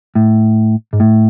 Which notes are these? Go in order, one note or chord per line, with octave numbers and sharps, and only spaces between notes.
A2
G#2
A2